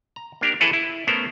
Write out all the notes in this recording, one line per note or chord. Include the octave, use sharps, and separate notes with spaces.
A#5
A#3 D4 G4 A#4
E3 E4 G#4 A4 B4 C#5
E4
A3 B3 C#4 A#4 C5